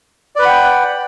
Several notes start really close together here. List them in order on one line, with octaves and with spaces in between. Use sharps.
D5 B4 B5 F#5 G5